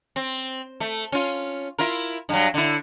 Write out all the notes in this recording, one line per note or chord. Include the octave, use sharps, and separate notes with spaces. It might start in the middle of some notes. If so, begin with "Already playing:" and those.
C4
A3
C#4 F4
E4 F4 A#4
G2 F#3
D3 E4